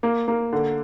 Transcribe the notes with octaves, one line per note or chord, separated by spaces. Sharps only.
A#3
A#3
D3